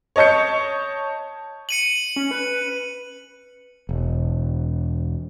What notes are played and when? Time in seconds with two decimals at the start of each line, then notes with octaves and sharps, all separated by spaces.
0.16 C#5 D#5 A5 G6 C#7
1.69 C#7 D#7 F#7
2.16 C#4
2.31 B4
3.89 E1